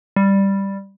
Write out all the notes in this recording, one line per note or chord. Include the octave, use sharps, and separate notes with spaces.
G3